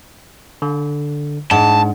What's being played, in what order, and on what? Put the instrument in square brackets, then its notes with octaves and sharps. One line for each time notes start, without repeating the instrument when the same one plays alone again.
[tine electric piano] D3
[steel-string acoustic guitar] G#2 [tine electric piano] D4 [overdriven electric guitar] A5